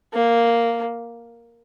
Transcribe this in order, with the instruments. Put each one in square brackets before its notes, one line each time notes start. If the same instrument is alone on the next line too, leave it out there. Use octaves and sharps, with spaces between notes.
[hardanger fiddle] A#3